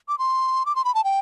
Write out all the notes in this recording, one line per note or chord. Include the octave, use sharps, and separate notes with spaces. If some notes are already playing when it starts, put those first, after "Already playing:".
D6
C6
D6
C6
B5
A5
G5